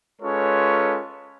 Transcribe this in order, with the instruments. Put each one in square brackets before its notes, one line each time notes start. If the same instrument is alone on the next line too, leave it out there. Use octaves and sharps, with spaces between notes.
[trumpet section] G#3 C#4 F4 A4 B4 C#5